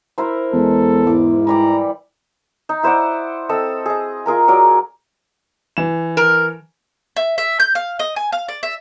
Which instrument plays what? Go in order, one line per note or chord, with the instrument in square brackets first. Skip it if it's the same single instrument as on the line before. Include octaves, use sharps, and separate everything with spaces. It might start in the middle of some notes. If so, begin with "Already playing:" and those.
[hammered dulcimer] E4 A#4 C5
[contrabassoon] E2 [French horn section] G#3 [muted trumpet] A4
[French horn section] G#2 E4 [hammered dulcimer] D6
[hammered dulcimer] E3 G3 D5 [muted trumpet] A#5
[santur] D#4
E4 C5 D5 F#5
C4 A4 D#5 E6
G#4 D#5
F4 G#4 A#4 A#5
F#3 A#4 D5 F#5
[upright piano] E3 E7
[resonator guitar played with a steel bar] A#4
[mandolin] E5
E5
G6
F5
D#5
G#5
F5
D5
E5